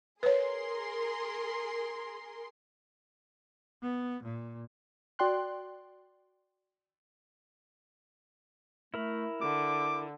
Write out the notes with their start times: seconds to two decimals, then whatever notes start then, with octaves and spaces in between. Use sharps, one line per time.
0.23 G#4 A#4 B4 C#5 C6
3.82 B3
4.23 A#2
5.19 F#4 D5 G5 C6 F#6
8.94 A3 E4 A#4 B5
9.41 D3 D6